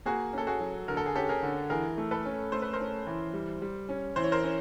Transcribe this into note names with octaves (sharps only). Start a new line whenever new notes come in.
A#3 F#4 G#4
C#4 A4
F#4 G#4
F#3
D3 A#4
A4
G#4
C#4 G4 A4
G#4 A#4
D3
E3 G#4 A#4
A3
A4 B4
C#4
A3 C5
B4
A#4 C5
C#4
E3
G3
G3
C#4
E3 C5
C#5
A#4 C5
C#4